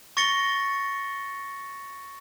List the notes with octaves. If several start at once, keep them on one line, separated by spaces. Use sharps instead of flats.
C#6 A6 A#6 C#7 G7